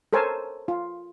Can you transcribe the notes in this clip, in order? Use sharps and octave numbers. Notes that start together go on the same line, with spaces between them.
A4 A#4 C5 C#5 G#5 A5
F4